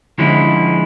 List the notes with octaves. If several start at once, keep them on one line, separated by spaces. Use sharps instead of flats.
D3 F3 G#3 C#4 E4